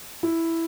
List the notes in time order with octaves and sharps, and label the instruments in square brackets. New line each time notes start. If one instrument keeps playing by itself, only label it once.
[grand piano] E4